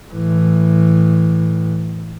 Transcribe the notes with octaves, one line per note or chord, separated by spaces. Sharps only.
A2 E3